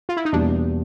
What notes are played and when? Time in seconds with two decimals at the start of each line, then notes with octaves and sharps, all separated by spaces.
0.09 F4
0.17 E4
0.25 D#4
0.32 E2 B2 G3 A#3 D4